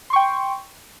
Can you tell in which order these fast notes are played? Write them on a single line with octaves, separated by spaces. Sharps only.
C6 C#6 G5